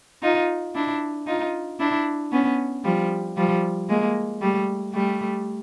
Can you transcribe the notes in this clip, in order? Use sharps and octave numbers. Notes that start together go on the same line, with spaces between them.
D#4 F4
D4 E4
D#4 F4
D4 E4
B3 C#4
F3 G3
F3 G3
G#3 A#3
G3 A3
G3 A3